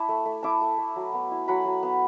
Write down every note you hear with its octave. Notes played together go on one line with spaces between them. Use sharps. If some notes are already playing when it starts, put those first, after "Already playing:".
Already playing: E4 A5 B5 D6
A3
A3
E4 A5 D6
A3
A3
F#3
B3
E4
F#3 F#5 B5
F#3
B3